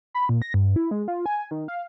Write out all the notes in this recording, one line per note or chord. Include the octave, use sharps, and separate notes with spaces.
B5
A#2
A#6
G2
E4
G#3
F4
G#5
D#3
F5